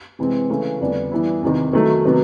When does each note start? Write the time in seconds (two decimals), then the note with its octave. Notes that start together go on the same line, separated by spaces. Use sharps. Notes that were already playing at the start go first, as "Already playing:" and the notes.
0.19 C3 E3 G#3 C4
0.50 C#3 E3 A3 C#4
0.80 F2 D3 G3 B3 D4
1.11 E3 G3 B3 E4
1.42 E2 C3 D#3
1.73 D#3 F#3 A3
2.05 C3 D#3 F#3 B3